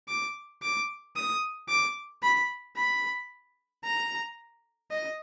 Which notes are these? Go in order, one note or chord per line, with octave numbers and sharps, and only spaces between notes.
D6
D6
D#6
D6
B5
B5
A#5
D#5